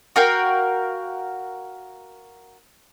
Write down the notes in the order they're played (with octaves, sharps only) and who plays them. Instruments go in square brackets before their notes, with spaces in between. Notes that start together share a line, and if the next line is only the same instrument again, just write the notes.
[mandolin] F#4 A#4 F5 G5